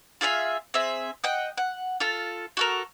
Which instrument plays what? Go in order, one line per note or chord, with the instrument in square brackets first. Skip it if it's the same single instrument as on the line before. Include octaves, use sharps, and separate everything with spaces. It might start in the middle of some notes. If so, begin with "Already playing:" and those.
[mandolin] F4 G#4 E5 F5
C4 G#4 E5
D#5 F#5 G5
F#5
F4 A4
F#4 A4 A#4